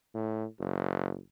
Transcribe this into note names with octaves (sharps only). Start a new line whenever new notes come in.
A2
F#1